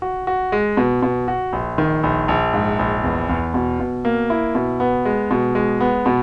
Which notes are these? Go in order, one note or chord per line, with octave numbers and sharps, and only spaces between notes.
F#4
F#4
G#3
B2
B2
F#4
A#1
D#3
A#1
A#1
G#2
A#1
E2
E2
B2
B2
A#3
E4
B2
B3
G#3
B2
G#3
B3
B2